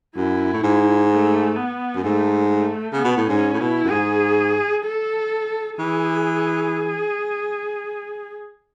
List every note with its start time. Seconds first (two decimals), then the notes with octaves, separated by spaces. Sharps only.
0.16 F#2 E4
0.53 A2
0.63 G#2
1.11 A3
1.56 B3
1.96 F#2
2.04 G#2 A3
2.51 A3
2.93 C#3 B3
3.04 B2
3.17 A2
3.29 G#2 C#4
3.53 A2
3.60 B2 E4
3.84 F#2
3.91 G#2 G#4
4.85 A4
5.79 E3 G#4